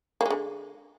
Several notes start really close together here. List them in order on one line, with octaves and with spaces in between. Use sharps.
A#3 G#3 D3